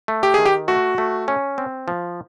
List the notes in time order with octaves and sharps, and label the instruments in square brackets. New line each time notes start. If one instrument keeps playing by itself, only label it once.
[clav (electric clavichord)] A3
[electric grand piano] G4
[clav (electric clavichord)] D#3 [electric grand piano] G#4
[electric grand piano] G4
[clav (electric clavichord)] A3 [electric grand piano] F#4
[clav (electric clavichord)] A3
C#4
C4
F3